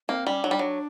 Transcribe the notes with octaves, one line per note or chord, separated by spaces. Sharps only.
A#3 C4
G3 C#4
F#3 D4
G3
F#3